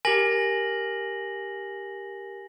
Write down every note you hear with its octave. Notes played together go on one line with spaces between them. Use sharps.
G4 A#4 G#5 A#6 F#7